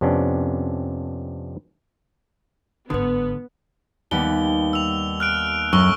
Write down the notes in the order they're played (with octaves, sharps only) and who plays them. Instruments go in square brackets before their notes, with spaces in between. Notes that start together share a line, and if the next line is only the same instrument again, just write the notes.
[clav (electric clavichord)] F2 C3 B3 C#4 D4
[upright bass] G1 G#2 [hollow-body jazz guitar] D3 [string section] B3 [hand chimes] B4 D#6
[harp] D#2 G3 B3 [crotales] G7
[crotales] E6 F7
F6 F#6 D7
[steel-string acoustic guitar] F#2 [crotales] C#6 E6 G7